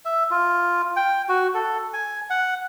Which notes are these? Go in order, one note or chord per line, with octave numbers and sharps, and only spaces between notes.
E5
F4
G5
F#4
A4
G#5
F#5